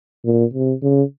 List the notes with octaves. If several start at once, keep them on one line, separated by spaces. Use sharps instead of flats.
A#2
C3
C#3